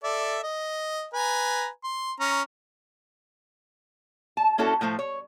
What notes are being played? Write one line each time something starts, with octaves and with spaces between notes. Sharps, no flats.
A4 D5 E5
D#5
B4 G#5 A#5
C6
C#4 A#5
A5
A#3 C#4 E4 F#4 A4
A2 F3 A3 C5
C#5